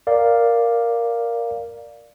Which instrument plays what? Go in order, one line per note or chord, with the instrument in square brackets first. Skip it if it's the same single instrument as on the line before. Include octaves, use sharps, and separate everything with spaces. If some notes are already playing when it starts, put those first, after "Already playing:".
[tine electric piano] A#4 D5 F5